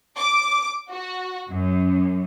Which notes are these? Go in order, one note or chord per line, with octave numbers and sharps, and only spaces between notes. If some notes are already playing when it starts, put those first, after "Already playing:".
D6
F#4
F#2